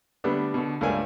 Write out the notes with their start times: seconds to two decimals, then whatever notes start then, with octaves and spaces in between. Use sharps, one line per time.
0.24 D3 G3 A3 B3 D4
0.54 B2 D3
0.81 C#2 G2 A3 A#4 D5 G#5